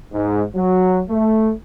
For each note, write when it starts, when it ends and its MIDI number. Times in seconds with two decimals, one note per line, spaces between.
0.13 0.43 44
0.55 1.02 54
1.09 1.51 57